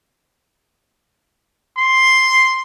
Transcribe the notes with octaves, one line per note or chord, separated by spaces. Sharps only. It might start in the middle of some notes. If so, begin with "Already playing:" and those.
C6